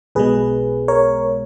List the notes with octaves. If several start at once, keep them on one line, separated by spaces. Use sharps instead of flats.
B1 B2 G#3 G#4 B4
A#4 C#5